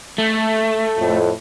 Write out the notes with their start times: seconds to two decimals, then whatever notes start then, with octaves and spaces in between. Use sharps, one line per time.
0.18 A3
0.99 F2 A2